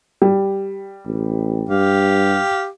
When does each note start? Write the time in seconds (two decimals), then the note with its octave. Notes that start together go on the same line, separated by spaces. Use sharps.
0.22 G3
1.06 A1
1.69 G2 G4 F5